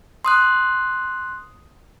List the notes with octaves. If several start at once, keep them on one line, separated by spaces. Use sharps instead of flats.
C6 D#6 F#6